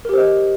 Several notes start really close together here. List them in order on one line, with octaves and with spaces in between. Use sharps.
A#4 G4 C5 D#5